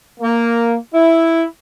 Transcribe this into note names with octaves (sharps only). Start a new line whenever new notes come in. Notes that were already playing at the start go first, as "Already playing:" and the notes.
A#3
E4